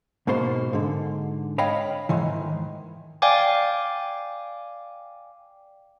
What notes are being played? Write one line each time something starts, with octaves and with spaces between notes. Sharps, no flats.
G#2 B2 A#3 C5 C6
G#2 D3
C#5 D#5 F5 G5 B5
D#2 G#2 D#3 E3
D5 F5 G5 G#5 D6